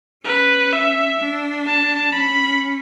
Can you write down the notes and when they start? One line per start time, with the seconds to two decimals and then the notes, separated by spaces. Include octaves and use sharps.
0.24 C#4 B4
0.72 E5
1.19 D4
1.66 A5
2.13 C#4 B5